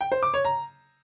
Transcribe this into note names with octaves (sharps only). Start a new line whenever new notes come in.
G5
C5
D6
C#5
A#5